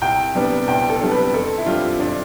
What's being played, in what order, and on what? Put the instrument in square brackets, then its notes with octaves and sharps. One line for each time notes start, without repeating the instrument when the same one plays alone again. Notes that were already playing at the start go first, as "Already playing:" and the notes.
[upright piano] C2 G5
C3 G3 B3 D4
C2 G5
A4
C3 G3 B3 D4
B4
F2 A4
E4
D3 G3 C4 F4
F2 D4